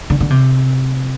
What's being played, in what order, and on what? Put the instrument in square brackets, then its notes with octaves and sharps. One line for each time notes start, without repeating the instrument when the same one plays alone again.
[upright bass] D3
D3
C3